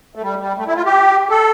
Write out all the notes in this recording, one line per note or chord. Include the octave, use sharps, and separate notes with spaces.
A3
G3
G3
A3
E4
F4
G4
A4